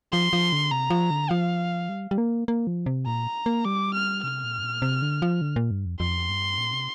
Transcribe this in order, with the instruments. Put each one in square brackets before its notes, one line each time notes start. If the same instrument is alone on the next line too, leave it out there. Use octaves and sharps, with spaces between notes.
[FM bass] F3 [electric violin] C6
[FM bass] F3
D3
[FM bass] C3 [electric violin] A#5
[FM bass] F3
D3
[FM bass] F3 [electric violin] F5
[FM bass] G3
G3
A#3
A#3
F3
C3
[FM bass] A#2 [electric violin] A#5
[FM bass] A#3
[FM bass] G3 [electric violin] D6
[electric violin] F6
[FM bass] C3 [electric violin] F6
[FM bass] A#2
G2
A#2
C3
D3
F3
D3
A#2
G2
F2
[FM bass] F2 [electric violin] C6
[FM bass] G2
A#2
C3